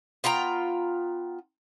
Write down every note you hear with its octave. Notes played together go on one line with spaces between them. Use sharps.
B3 F4 G5 A#5